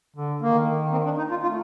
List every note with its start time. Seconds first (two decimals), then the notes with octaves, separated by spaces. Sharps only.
0.16 D3
0.42 D#3 A#3
0.92 C4
1.05 D4
1.18 D#4
1.30 F4
1.42 A3 F4